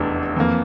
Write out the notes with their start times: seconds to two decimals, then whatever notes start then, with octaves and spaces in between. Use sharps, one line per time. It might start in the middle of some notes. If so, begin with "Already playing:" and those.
Already playing: F1 E2 E3 A3 D4
0.36 F2 E3 A#3